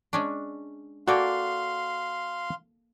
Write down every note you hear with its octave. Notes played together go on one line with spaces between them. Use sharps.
G#3 C#4 D4
A#3 F#4 A4 D5 F5 G5 C6